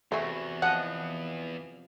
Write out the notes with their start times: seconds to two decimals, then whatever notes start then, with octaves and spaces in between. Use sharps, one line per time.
0.12 E2 C3 A3 F#4 G#4
0.62 F3 D#5 F#5